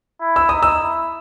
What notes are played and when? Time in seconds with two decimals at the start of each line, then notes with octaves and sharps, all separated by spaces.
0.21 E4
0.36 E6
0.49 D#4 D#6
0.63 E6
0.82 E4